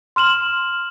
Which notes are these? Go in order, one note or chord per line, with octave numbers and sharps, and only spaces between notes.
C6 F6 E7 F#7